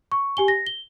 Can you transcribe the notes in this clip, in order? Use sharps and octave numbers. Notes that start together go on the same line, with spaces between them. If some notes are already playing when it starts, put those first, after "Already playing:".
C#6
G4 G#5 G7
A#6
G7